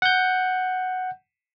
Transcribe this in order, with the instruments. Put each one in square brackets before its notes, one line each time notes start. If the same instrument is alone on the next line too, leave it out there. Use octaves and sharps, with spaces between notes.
[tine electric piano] F#5 G6